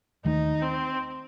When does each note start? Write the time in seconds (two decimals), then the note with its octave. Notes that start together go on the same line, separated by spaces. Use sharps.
0.24 D#2 D#3 A3 D#4
0.62 C4